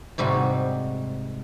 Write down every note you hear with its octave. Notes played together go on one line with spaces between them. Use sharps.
G#2 C3 G3 F#4